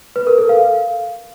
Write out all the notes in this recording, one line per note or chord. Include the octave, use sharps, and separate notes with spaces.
B4
A#4
A4
F5